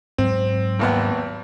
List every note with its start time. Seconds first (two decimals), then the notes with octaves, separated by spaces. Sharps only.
0.18 G#2 F#3 C4
0.79 G#1 D#2 B3